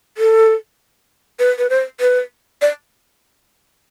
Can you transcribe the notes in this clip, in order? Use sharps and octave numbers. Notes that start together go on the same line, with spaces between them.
A4
B4
B4
C5
B4
D5